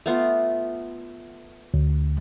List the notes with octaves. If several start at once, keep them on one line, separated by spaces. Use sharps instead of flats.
A3 B3 F4
D2